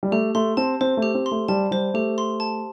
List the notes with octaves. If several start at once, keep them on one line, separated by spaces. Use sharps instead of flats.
G3
A3 G4
A3 C6
C4 A5
C4 C5
A3
G4
C4
C6
A3
G3 A5
G3 C5
A3 G4
C6
A5